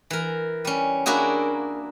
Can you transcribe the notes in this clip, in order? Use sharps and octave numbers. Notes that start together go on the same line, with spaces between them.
E3 A#4
G3 C#4
A#3 D4 E4 F#4 G#4